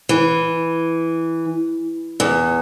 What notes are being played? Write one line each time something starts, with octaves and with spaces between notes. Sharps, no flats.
E3
E2